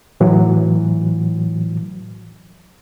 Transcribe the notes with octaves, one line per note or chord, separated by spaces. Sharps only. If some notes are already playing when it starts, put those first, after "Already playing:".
A2 E3 F#3